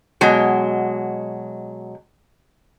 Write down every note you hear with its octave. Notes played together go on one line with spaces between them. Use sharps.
B2 F#3 G#3